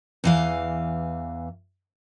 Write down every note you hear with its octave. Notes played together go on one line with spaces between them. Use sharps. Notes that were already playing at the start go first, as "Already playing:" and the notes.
E2 E3 F5